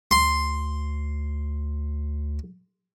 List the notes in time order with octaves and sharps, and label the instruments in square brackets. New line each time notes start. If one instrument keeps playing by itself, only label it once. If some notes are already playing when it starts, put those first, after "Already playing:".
[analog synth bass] D2 [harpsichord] C6